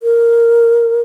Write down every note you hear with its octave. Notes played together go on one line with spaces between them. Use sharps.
A#4